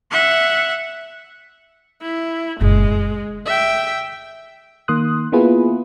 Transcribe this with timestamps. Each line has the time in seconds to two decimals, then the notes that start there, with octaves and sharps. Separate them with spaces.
0.11 E5 F#5
2.02 E4
2.61 F#1 A#2 G#3
2.95 D3
3.46 E5 G5
4.88 D#3 A#3 C6 D#6 F#6
5.32 A#3 B3 E4 F4 G#4 B4